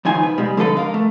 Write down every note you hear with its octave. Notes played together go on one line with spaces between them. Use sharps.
C#2 D#3 F3 G#5
B4
B2 G3 G#3
D3 F3 G#3 A4 B4
A#4 F5
A3